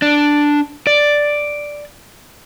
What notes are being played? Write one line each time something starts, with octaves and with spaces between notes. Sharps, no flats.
D4
D5